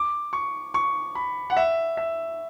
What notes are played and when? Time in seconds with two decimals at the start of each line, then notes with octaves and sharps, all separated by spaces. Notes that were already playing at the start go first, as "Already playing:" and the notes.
Already playing: D6
0.33 C#6
0.74 C#6
1.15 B5
1.50 F#5
1.57 E5
1.97 E5